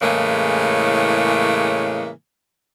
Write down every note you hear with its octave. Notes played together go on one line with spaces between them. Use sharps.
A2 C#3 E3 G#3 A#3